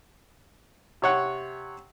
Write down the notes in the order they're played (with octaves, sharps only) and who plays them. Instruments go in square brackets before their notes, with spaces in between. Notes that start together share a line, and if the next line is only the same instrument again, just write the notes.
[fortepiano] C3 C#5 F#5